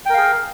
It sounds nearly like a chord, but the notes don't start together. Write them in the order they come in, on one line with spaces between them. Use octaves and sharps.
G5 A#4 F5 G#4